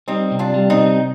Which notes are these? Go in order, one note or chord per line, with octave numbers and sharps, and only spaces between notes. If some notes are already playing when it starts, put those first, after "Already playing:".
G3 C4 D#4
C3
D4 F4
G3
C4 D#4
C3